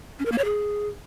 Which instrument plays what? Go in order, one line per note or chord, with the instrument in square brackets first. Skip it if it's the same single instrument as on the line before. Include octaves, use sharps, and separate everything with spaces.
[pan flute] C#4
A#4
A#3
C#5
G#4